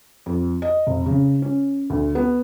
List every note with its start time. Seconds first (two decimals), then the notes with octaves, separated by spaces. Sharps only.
0.26 F2
0.62 D#5
0.87 F1
1.06 C#3
1.42 C#4
1.90 D2
2.15 B3